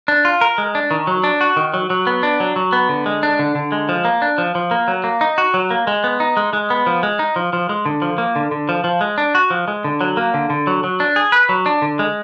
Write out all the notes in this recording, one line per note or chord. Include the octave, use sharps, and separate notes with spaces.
D4
F4
A#4
G#3
D4
D#3
F#3
D4
F#4
D#3
F#3
F#3
B3
D4
F#3
F#3
B3
D3
G#3
D4
D3
D3
G#3
F3
A#3
D4
F3
F3
A#3
F#3
A#3
D#4
F#4
F#3
A#3
G#3
B3
D#4
G#3
G#3
B3
F3
G#3
D#4
F3
F3
G#3
D3
F3
A#3
D3
D3
F3
F3
G#3
D4
F#4
F3
G#3
D3
F#3
A#3
D3
D3
F#3
F#3
D4
G#4
B4
F#3
D4
D3
G#3